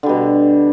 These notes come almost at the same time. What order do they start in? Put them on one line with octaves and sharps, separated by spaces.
D3 G3 B2